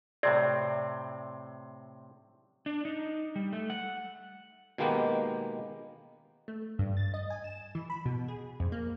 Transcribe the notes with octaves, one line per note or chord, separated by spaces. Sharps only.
A2 C3 C4 D5
D4
D#4
G3
A3
F#5
B2 D#3 G#3 A#3 B3 G4
A3
G2
A6
D#5
G#5
E7
E3
B5
B2
G#4
F2
A#3